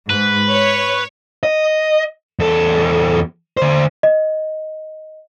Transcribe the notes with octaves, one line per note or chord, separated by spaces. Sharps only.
G#2 B4
C#5
D#5
E2 A4
D3 C5
D#5